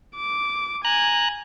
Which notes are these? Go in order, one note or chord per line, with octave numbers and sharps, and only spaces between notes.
D6
G#5 A#5 F#6